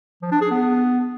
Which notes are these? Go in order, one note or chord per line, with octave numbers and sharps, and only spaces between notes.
F3
D4
G#4
B3